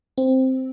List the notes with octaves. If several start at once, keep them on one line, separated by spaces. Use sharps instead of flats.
C4